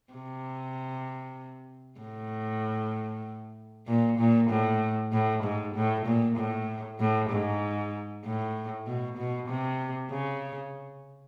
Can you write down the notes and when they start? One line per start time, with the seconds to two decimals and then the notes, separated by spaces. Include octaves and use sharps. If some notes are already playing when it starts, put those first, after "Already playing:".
0.13 C3
2.00 A2
3.87 A#2
4.19 A#2
4.50 A2
5.12 A2
5.43 G#2
5.75 A2
6.06 A#2
6.37 A2
7.00 A2
7.31 G#2
8.24 A2
8.87 B2
9.18 B2
9.49 C3
10.11 C#3